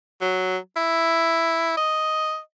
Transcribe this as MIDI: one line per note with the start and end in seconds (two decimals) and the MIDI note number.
0.21 0.57 54
0.77 1.76 64
1.77 2.39 75